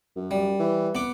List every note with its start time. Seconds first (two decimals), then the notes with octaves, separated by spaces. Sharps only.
0.16 F#2
0.31 G3
0.59 E3
0.95 B3 D6